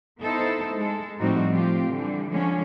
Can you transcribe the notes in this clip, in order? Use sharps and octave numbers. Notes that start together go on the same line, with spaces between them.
B3 D#4 E4 A4 C5
G#3 A4
A2 F3 G3 C4 D#4 F#4
F3 A3 C4 F4 G4
D3 E3 G3
D3 F3 G#3 C#4